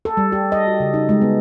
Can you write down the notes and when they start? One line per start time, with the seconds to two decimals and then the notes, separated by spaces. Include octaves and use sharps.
0.05 A4
0.17 G3
0.32 G4
0.52 D#5
0.67 F#4
0.80 C#3
0.94 D#4
1.09 G#3
1.21 B3